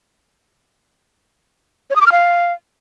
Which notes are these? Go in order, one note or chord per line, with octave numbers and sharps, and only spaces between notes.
C#5
D#6
D6
F6
F5